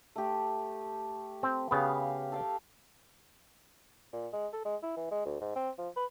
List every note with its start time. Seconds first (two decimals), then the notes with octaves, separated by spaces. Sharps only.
0.16 A3 G4
1.43 C4
1.71 C#3 B3 G4 F5
2.32 A4 F5 G5
4.13 A#2
4.33 G#3
4.53 A4
4.65 G#3
4.83 E4
4.97 E3
5.11 G#3
5.26 D2
5.41 G#2
5.56 C4
5.78 F3
5.97 B4